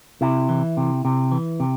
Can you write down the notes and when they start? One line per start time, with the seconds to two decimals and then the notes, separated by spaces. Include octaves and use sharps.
0.21 C3 E4
0.49 E3
0.77 C3
1.05 C3
1.32 E3
1.60 C3